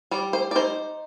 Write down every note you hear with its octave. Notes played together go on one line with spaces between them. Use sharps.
G3 D5
C5
D5
D#4 C5